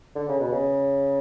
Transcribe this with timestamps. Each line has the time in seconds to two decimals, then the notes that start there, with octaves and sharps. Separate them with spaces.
0.15 D3
0.28 C#3
0.40 B2
0.52 C#3